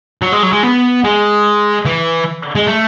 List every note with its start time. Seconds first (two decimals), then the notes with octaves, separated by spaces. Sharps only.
0.22 F#3
0.32 G#3
0.43 F#3
0.53 G#3
0.63 B3
1.04 G#3
1.86 E3
2.55 G#3
2.67 A3